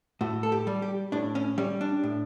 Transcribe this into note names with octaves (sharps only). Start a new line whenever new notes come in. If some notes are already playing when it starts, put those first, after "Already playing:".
A2 F#4
A4
G4
G3
G4
A2 D4
C#4
G3 C#4
D4
A2